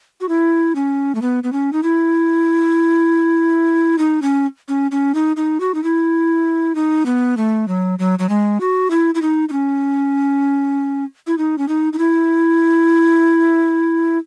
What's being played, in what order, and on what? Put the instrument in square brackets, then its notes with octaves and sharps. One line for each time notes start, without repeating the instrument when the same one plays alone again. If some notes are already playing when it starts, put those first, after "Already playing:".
[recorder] F#4
E4
C#4
A3
B3
B3
C#4
D#4
E4
D#4
C#4
C#4
C#4
D#4
D#4
F#4
D#4
E4
D#4
B3
A3
F#3
F#3
F#3
G#3
F#4
E4
E4
D#4
D#4
C#4
E4
D#4
C#4
D#4
D#4
E4